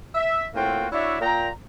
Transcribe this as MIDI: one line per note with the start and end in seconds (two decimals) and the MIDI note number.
0.15 0.47 76
0.54 0.87 45
0.54 0.87 58
0.54 0.87 60
0.54 0.87 65
0.54 0.87 66
0.54 0.87 79
0.92 1.18 62
0.92 1.18 64
0.92 1.18 66
0.92 1.18 73
0.92 1.18 74
0.92 1.18 76
1.21 1.49 46
1.21 1.49 79
1.21 1.49 82